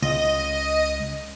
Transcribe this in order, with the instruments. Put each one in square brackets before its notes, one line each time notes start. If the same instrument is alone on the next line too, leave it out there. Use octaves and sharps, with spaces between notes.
[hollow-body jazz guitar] C#2 [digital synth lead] D#5